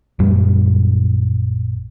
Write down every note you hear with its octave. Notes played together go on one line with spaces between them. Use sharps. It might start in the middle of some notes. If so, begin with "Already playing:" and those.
A#1 F#2 G3